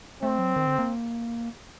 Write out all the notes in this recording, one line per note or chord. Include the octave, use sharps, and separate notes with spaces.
A3 C4
F#3
D#3
D3
A#3